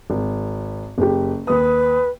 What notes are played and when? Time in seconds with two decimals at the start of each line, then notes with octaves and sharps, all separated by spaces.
0.10 G#1
0.98 F#1 G4
1.47 D#2 B4 D#6